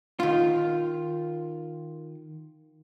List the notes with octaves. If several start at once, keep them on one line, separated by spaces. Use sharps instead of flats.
D#3 F4